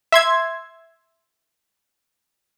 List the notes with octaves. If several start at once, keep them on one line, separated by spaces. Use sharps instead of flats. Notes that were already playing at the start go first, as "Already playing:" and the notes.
E5 C6 G#6